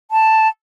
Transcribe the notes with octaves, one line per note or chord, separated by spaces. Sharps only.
A5